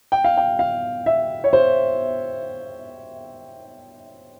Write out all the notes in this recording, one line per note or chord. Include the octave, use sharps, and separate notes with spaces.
G5
F5
G5
F5
E5
C#5
C5